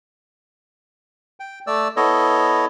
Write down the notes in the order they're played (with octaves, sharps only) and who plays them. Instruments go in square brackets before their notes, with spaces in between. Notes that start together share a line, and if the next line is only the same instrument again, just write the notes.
[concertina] G5
A3 D5 E6
B3 E4 A4 C#5 D#5